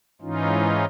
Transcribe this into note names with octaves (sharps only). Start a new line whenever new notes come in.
G#2 E3 C#4 D#4 F4